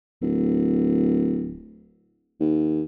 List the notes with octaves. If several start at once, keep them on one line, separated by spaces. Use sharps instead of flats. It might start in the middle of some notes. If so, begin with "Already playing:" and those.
D1
D#2